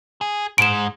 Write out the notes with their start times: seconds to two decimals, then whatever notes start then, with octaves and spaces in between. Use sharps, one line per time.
0.21 G#4
0.58 G#2 G#3 D7 E7